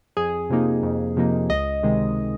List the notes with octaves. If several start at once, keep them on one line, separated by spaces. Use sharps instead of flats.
F2 G#4
C3 F3 A#3 D#4
F2
C3 F3 A#3 D#4
C#2 D#5
C3 D#3 G#3